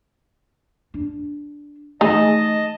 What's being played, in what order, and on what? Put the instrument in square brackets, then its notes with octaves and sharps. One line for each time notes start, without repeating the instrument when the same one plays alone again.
[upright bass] D4
[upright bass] E3 A3 [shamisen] D#4 G#4 [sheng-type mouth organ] D#5 A5